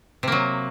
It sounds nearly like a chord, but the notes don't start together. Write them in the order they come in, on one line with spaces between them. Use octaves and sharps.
C3 A#3 F#3